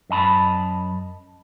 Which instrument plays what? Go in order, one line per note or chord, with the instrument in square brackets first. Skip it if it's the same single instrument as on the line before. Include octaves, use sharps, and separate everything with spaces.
[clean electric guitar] F#2 D#5 A5 B5